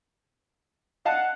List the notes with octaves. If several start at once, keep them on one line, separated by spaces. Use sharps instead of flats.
D#5 F5 F#5 A5